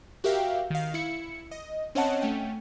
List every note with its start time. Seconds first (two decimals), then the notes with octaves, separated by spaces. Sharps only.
0.24 F#4 G4 A#4 E5 F5 G5
0.70 D#3 F5
0.94 E4 C#7
1.51 D#5
1.95 C4 C#4 C#5 D#5 F#5 A5
2.22 A3 C#4 G5